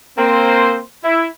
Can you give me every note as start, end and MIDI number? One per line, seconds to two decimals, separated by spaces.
0.18 0.80 58
0.18 0.80 60
0.18 0.80 72
1.04 1.26 64